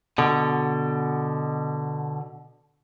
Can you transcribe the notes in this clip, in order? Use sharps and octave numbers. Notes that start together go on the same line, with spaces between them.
B2 D3